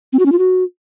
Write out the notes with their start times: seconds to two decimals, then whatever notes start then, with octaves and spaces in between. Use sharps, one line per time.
0.13 C4
0.19 F#4
0.26 C#4
0.32 F4
0.39 F#4